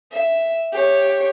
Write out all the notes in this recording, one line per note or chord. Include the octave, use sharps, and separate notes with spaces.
E5
G4 C#5